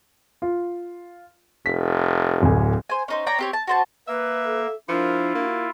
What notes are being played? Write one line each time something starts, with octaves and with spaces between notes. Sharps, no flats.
F4
F1 B6
D1 D2 G#5
C5 G#5
C#4 D#4 C5
C#5 D5 G5 A#5
C4 G4 C#5
A5
F#4 C5 A5
A#3 B4 E5
A4
F3 D4 E4 F4 A#4
A#3 F#4